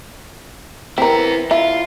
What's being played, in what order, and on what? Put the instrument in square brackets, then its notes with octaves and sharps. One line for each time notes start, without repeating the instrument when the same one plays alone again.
[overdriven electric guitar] B3 E4 [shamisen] C4 A#4
[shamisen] E4 [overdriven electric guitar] F4